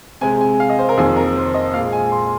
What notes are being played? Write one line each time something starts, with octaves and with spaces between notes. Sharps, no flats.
C3 G#3 G#5
G#5
F5
D#5
C5
A#4
F2 D#3 A#3 G#4
A#4
C5
D#5
A#2 G#3 F5
G#5
C6